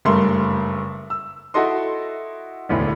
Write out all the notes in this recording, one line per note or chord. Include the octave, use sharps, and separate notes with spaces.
F#1 G2 A3 A#4 C6
E6
E4 F#4 A4 D#5 C6
E1 D2 A2